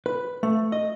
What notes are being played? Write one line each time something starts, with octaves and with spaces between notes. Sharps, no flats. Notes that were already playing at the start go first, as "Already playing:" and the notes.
B4
A3
D#5